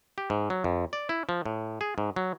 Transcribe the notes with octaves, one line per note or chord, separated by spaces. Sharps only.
G4
G#2
F#3
F2
D5
E4
F3
A2
G#4
G#2
F#3